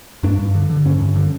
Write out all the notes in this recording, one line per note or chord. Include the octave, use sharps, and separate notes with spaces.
G2 D4
G2
D3
D3
G2 C#4
G2
D3